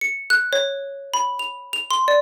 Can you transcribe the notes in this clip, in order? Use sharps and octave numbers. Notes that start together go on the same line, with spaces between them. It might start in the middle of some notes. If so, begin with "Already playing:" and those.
C#7
F#6
C#5
B5
F7
F7
C6
D5